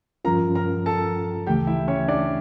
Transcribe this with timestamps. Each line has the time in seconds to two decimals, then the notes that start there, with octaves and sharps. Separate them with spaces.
0.25 G2 F3 C#4 F4 A#4 A#5
0.55 A#4 A#5
0.86 A4 A5
1.47 D2 C#3 E3 A3 G4 G5
1.67 E4 E5
1.88 C#4 C#5
2.08 D4 D5